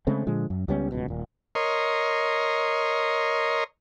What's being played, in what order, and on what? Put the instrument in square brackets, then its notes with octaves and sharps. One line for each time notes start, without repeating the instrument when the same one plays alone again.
[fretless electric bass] C#3 G#3 A3 C4
A#2 D3 F3 G#3
F#2
C#2 G3 B3 C#4
D1 C#2 B2
D#1 A#2
[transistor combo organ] A#4 C#5 D#5 C6